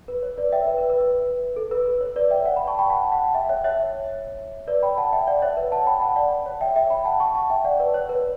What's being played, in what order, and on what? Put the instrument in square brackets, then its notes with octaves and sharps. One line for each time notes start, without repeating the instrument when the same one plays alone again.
[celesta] B4
C#5
B4 D5
E5 G5
B4
B4
B4
B4
A4
B4
B4
C#5
B4 D5
E5 G5
D5 F#5
G5 B5
A5 C#6
G5 B5
F#5 A5
F#5 A5
E5 G5
C#5 E5
C#5 E5
B4 D5
G5 B5
F#5 A5
E5 G5
D5 F#5
C#5 E5
B4
F#5 A5
G5 B5
F#5 A5
D5 F#5
C#5
E5 G5
E5 G5
G5 B5
F#5 A5
A5 C#6
F#5 A5
E5 G5
D5 F#5
B4 D5
C#5
B4